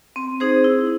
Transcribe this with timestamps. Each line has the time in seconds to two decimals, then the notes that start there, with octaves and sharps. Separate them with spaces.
0.16 C4
0.40 D#4 G#4 C5
0.64 E4